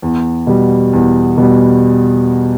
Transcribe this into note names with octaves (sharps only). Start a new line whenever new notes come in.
E2
B2 G3
E2
B2 G3